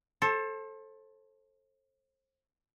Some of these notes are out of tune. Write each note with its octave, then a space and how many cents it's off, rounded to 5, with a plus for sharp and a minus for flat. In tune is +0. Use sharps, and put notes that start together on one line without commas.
A4 +0 C5 +35